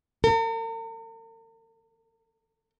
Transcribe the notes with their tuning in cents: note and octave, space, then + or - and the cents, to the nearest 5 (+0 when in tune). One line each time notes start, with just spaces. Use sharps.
A#4 -45